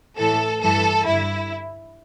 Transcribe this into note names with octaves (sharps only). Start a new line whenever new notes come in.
A2 E3 A4
G2 E3 A4
G2 E4
D3